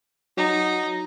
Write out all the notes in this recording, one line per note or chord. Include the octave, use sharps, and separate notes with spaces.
F#3 D#4